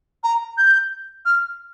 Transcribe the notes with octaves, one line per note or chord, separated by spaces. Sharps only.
A#5
G6
F6